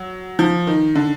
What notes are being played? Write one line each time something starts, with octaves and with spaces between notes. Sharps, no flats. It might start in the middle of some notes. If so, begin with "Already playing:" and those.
Already playing: F#3
F3
D#3
D3